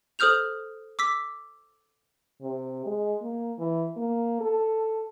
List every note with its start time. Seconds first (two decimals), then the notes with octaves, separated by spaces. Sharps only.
0.19 A4 C5 D#6 F6 G6 F7
0.99 D6 E6 B6
2.42 C3
2.86 G#3
3.22 A#3
3.58 E3
3.97 A#3
4.41 A4